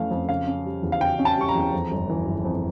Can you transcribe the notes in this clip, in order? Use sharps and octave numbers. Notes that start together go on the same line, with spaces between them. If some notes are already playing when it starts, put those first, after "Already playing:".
Already playing: F2 E3 A3 C#4 F5
F2
C#3 F5
C#4
G3
E2
F5
C#3 G5
C#4
A5
G3 C#6
A#5
E2
F2
G1
E3
G1
F2